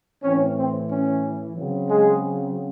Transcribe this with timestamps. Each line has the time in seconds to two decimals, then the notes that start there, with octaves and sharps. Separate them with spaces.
0.23 A2 E3 C4 C#4
0.56 C4
0.89 C#4
1.55 C#3 F#3 C4
1.87 G#3 G#4